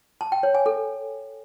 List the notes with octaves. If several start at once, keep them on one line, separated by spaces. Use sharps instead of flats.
A5
G5
C#5
G#5
A4